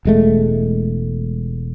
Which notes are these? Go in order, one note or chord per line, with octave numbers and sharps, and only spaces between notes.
E1 G#3 A3